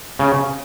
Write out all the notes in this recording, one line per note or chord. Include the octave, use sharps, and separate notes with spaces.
C#3